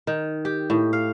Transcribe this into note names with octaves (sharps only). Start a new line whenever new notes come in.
D#3
G4
A2
F5